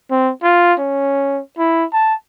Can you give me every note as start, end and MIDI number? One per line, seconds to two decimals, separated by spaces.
0.11 0.31 60
0.43 0.74 65
0.79 1.41 61
1.58 1.85 64
1.93 2.14 81